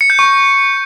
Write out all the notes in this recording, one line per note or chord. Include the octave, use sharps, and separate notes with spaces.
C#7
G6
C#6